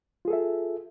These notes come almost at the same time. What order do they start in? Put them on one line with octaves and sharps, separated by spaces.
F4 G#4 A4 E5